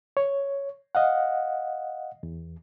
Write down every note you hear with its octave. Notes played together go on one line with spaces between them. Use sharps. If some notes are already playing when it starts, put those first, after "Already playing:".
C#5
D#5 F5 F#5
E2